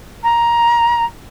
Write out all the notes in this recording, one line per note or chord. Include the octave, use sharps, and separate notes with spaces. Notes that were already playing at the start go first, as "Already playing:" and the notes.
A#5